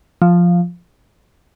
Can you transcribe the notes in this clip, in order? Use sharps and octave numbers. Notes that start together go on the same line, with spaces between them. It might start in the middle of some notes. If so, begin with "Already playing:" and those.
F3